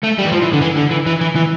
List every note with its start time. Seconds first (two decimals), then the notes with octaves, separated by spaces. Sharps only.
0.03 A3
0.18 G3
0.26 E3
0.32 F3
0.42 E3
0.53 D3
0.61 E3
0.76 D3
0.91 E3
1.06 E3
1.21 E3
1.36 E3